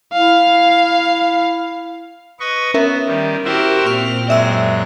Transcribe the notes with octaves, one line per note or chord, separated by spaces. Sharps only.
E4 F5
B4 D#5 C#6
B3 C#4 A#4 E5
D#3 G3
E4 F#4 G4 A#4 C5 E5
A#2 C4 C#6 F6
F#2 G#3 D5 E5 E6